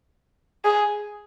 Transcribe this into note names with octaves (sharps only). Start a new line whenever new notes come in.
G#4